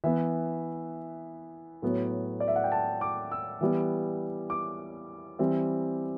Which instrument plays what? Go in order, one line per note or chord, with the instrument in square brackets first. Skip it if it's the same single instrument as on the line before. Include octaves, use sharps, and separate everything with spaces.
[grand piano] E3 B3 E5
A2 F#3 B3
D5
E5
F#5
G5
A5
D6
E6
E3 G3 B3
D6
E3 G3 C4